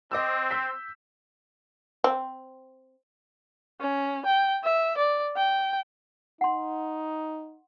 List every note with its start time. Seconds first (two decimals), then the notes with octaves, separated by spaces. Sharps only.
0.12 C4 D#5 D6 E6
0.51 E6 G6 B6
2.04 C4
3.81 C#4
4.26 G5
4.64 E5
4.97 D5
5.37 G5
6.41 D#4 F#5 C6